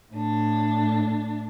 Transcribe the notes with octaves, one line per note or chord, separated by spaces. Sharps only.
A2 D4